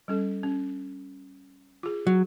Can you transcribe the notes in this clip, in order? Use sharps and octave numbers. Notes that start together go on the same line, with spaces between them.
G3 C#4 A4
C#4
F4 G#4
F#3